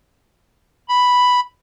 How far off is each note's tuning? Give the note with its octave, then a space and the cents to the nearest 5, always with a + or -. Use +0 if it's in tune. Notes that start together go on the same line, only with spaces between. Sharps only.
B5 +0